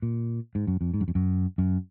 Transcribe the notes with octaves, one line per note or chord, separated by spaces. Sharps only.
A#2
G#2
F#2
F2
G#2
F#2
F2
F#2
F#2